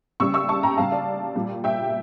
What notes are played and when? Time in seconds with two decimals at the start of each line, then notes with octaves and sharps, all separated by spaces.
0.20 C#3 G3 C#6 E6
0.34 C#6 E6
0.49 A5 C#6
0.63 G5 A#5
0.78 C#3 G3 F5 A5
0.92 D5 F5
1.35 A#2 G3
1.64 E5 G5